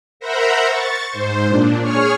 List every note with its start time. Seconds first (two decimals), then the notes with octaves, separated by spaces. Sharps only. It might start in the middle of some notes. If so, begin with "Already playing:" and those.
0.20 A#4 C5 E5 F#5 A#5 B5
0.67 C#6 A6
1.10 G#2 C5
1.47 A#2 D4
1.81 G#4 C#5 C#6 F6